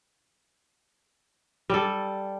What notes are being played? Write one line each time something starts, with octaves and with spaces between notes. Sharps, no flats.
G3 A4